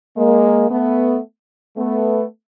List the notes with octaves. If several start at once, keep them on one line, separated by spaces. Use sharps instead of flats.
G#3 A#3
A3 B3
A3 B3